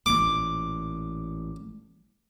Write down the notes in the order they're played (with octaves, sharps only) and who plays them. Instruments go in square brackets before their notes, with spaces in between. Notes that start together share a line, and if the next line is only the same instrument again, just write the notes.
[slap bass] A1 A#2 [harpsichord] D6